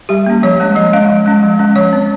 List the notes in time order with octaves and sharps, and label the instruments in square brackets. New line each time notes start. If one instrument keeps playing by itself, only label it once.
[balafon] G3 G4
A#3 C#4
F3 C#5
G#3 C#4
F3 D#5
G#3 C#4 F5
F3
G#3 C#4
F3
G#3 C#4
F3 C#5
C4